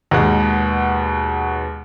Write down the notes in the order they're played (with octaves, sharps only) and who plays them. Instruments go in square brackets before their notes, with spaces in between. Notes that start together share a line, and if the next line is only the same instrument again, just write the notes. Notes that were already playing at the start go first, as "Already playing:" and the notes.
[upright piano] D#2 B2 G#3 F#5